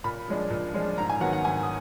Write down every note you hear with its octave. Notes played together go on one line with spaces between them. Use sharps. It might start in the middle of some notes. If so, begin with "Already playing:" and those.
A#2 B5
F3 G#3 D4
A#2
F3 G#3 D4
G#2 A#5
G#5
D#3 F#3 B3 F#5
F#5
G#2 G#5
D#6